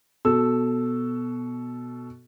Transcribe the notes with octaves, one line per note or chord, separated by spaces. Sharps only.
B2 A4 E6